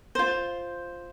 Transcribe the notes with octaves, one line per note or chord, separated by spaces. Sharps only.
F4 C5